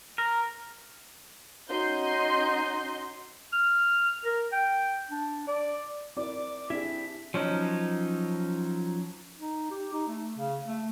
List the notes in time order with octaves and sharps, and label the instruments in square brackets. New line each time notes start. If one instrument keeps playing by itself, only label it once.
[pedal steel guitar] A#4
[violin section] C#4 D#4 F#4 D#5 C6 G6
[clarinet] F6
A#4
G5
D4
D5
[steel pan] C4 E4 A#4 [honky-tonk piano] D5 [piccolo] D6
[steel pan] C4 D4 G#4 [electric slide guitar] E4 G4 E5 [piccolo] B6
[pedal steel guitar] F3 F#3 C#4 D#4
[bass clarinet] D#4
G4
D#4
A3
C#3
A3